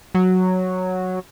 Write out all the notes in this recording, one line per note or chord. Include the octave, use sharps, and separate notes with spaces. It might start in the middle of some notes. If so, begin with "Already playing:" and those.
F#3